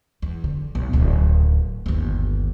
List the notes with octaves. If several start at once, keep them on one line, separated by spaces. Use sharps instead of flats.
E2
D3
B1
D1 D2
G1 D#2